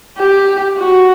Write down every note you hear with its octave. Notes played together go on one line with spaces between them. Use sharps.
G4
F#4